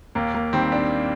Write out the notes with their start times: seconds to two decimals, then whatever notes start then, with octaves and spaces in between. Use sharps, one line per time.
0.15 D#2 A#3
0.34 A#3
0.53 D#3 G3 C4
0.72 D4